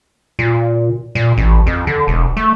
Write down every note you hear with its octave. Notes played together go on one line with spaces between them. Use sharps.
A#2
A#2
A1
F2
D3
E1
A3